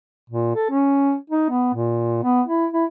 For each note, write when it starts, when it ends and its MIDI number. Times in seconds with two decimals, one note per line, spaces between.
0.30 0.51 46
0.55 0.69 69
0.71 1.15 61
1.30 1.46 63
1.50 1.71 59
1.74 2.21 46
2.23 2.42 59
2.47 2.66 64
2.73 2.85 64